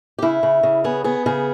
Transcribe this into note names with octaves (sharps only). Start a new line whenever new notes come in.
G4
C#3 E4
C#3
C#3
B3 G#4
B3 G#4
C#3 G#4